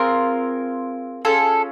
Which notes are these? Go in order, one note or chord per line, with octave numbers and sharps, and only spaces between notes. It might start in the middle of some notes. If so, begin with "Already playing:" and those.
Already playing: C4 F4 G#4 A#4
C#4 F4 G#4 A4